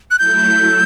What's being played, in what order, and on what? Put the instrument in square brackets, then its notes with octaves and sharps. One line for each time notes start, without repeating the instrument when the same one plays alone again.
[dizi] F#6
[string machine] F#3 A3 E4 A4 [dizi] G6